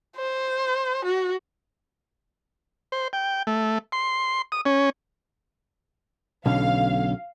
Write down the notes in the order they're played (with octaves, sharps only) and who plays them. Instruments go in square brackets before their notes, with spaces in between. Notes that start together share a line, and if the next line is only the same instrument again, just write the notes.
[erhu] C5
F#4
[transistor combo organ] C5
G5
A3
C6
D#6
C#4
[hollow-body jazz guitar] B1 [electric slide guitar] D3 C#4 [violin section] F5